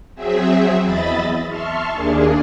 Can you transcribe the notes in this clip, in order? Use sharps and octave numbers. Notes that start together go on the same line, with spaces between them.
F#3 C4 G#4 E5
E2 D#5 E5 B5 A6
E5 A5 C6 C#6 F6
D#2 A#3 D4 G#4